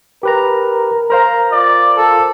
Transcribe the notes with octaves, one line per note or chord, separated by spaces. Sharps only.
G4 A#4 B4 A#5
A#4 C5 F5 A#5
F4 D5
A4